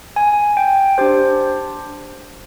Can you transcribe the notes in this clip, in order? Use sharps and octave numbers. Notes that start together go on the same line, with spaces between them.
G#5
G5
D4 G4 C5